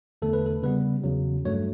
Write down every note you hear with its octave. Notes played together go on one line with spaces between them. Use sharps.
E2 D3 A3 A4
B4
A4
C#3 G3 B3 B4
E2 C#3 F#3
G2 F#3 A3 C#5